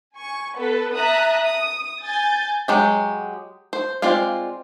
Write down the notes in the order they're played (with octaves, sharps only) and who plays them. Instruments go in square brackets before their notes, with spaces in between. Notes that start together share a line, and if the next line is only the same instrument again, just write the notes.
[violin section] G#5 C#6
B3 A4 B4
E5 A5 A#5 D#6 F#6
D#6
G#5 G6 A6
[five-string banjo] F#3 G#3 G4
C5
G#3 C4 F4 D5 F5